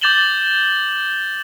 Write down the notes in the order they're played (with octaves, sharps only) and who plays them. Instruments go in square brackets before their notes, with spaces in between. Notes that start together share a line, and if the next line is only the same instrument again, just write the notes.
[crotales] D6 G6 A6 E7 F#7 G7